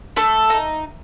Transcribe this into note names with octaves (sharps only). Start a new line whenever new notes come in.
A3 A4
D#4